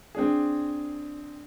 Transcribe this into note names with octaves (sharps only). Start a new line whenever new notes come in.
C4 D4 G#4